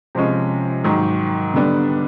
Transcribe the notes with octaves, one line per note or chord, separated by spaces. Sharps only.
C3 F3 G#3 C#4
G#2 D#3 F#3
D3 G3 B3 D4